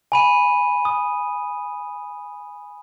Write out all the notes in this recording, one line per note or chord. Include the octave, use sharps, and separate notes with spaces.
G#5 B5 D#7
D#6